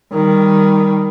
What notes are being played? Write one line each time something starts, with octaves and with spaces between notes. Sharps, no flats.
D#3 G3